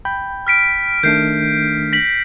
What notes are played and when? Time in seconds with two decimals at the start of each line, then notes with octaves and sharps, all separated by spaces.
0.05 G5 B5 G6
0.47 F6 B6 D7
1.03 D#3 A3 D4 G6 C7
1.93 A#6 B6 F#7